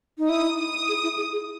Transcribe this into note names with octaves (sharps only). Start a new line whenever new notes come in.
D#4
E4 D#6
D#6
G#4
E4
G#4
G#4